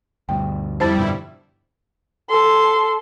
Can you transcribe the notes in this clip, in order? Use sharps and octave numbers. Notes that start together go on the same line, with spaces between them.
D2 G2 B2 G5
F2 G3 E4 C5 A5 A6
G2 B2 D3
A4 C6